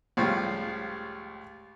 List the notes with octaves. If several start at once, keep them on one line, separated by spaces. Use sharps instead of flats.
C#2 A2 F3 G3